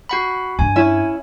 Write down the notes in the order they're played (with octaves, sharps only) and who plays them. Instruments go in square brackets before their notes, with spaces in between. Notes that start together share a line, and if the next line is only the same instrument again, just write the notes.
[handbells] F#4 F#5 B5
[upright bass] G2 [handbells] G#5
[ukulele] C#4 E4 E5